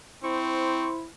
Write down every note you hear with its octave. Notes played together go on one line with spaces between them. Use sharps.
C4 E4 C5 C#6